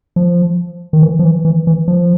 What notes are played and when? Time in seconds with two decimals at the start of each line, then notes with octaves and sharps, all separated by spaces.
0.16 F3
0.93 D#3
1.03 E3
1.19 F3
1.24 E3
1.45 E3
1.67 E3
1.88 F3